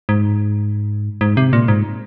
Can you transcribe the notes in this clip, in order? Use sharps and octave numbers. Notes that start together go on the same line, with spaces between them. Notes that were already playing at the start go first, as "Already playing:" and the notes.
G#2
G#2
C3
A#2
G#2